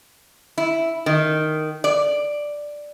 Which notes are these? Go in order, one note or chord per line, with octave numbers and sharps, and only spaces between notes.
E4
D#3
D5